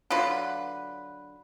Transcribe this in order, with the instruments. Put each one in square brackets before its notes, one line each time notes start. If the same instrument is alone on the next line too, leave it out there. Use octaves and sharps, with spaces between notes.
[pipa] D3 F#3 F4 B4